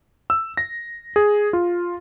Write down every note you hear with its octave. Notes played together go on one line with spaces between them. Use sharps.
E6
A#6
G#4
F4